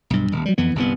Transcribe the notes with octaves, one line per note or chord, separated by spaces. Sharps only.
B1 G2
D#1
F#3 G3
F2 E3 B3
G1 C2 D3 B3